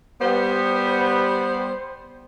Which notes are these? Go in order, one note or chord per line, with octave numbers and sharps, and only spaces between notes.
G3 B3 C5